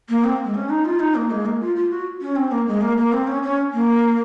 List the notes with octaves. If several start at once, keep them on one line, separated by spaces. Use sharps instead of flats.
A#3
C4
G#3
C#4
D#4
F4
D#4
A#3
G#3
A#3
F4
F4
F#4
C#4
C4
A#3
G#3
A#3
A#3
C4
C#4
C#4
A#3